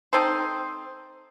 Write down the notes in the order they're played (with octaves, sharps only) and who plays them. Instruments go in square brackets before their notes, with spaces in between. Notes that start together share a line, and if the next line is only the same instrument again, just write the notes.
[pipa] C4 D#4 A4 C5